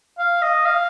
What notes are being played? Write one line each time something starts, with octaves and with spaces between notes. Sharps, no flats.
F5
D#5
F5